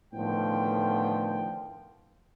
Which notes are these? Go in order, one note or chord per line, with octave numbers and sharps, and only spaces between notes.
A2 D3 D#3 F3 B3 G5